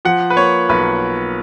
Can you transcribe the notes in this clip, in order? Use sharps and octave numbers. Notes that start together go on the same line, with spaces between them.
F3 F#5
B4
A#3 C#5
B1 B4